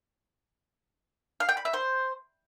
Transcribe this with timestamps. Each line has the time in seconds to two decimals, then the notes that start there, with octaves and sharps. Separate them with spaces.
1.40 F5
1.49 G5
1.57 B5
1.65 E5
1.73 C5